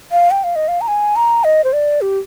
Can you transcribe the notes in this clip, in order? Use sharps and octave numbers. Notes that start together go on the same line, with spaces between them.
F5
G5
F5
D#5
F5
A#5
G#5
A#5
D#5
C5
D5
G4